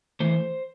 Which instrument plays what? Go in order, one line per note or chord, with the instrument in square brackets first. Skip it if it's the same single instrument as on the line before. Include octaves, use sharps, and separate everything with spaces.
[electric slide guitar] E3 A3 C5